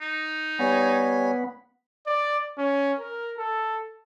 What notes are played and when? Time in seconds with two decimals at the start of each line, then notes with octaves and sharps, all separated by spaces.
0.01 D#4
0.59 G3 B3 C#5 G#5
2.07 D5
2.58 C#4
2.99 A#4
3.38 A4